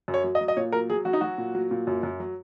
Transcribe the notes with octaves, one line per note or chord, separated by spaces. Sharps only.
F#2
C#5
F#3
D#5
F#3
D#5
A#2 C#5
F#3 A#4
F#3 G#4
F#3 F#4
D#4
F#3 F#4
A#2
F#3
A#2
F#2
F#2
F#3